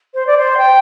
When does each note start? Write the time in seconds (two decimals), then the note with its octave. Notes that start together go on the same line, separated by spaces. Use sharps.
0.14 C5
0.27 D5
0.38 C5
0.58 G5